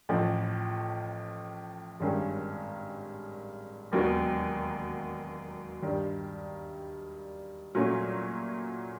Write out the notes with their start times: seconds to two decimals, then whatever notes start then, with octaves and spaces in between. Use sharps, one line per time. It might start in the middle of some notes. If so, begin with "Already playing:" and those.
0.09 A1 A2 F3
2.00 G#1 G2 D#3 G#3 C#4
3.92 E1 D#2 D#3 F#3 B3
5.82 G2 D#3 G3
7.75 A#2 F#3 A3 C#4